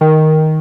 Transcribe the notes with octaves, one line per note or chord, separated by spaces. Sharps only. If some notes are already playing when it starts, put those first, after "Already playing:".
D#3